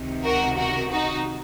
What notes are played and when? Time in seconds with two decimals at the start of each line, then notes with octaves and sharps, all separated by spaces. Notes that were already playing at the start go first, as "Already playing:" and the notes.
Already playing: C#2 C3 D#3
0.24 F#4 A#4
0.58 F#4 A#4
0.91 D#4 F#4